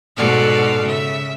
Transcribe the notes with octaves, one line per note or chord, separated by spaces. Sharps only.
G#2 B2 F#4 A4 D5 F5
C#3 E5